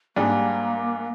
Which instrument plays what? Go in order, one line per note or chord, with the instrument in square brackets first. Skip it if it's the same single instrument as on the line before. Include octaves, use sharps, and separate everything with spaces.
[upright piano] G#2 G3 D4 G#4 [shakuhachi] A#3